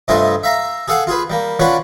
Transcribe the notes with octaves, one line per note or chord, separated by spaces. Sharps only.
G2 C3 A3 F4 D#5 G#5
E5 F5 A#5
G#4 A4 F5 F#5
F4 G#4 B4
G3 A#3
C#4 D4 F4 B4 C#5 F#5